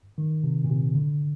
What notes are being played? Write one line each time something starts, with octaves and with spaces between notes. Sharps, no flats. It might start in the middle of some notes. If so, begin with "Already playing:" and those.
D#3
C3
A#2
C3
D3